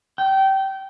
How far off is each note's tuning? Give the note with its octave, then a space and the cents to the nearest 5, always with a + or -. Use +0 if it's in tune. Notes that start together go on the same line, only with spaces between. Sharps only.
G5 -25